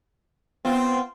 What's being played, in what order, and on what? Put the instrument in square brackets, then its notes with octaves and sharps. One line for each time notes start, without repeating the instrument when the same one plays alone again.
[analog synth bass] B3 [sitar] C4 F4